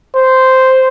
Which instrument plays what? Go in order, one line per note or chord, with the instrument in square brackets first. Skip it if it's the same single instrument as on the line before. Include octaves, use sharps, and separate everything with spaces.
[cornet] C5